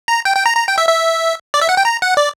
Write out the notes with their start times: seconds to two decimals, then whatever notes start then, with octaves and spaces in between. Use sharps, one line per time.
0.08 A#5
0.25 G5
0.36 G5
0.46 A#5
0.57 A#5
0.68 G5
0.78 E5
0.89 E5
1.54 D5
1.61 E5
1.69 F#5
1.77 G5
1.85 A#5
2.02 F#5
2.17 D5